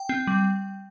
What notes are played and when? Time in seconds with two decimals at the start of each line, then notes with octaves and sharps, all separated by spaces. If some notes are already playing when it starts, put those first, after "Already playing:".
Already playing: G5
0.09 C4
0.27 G3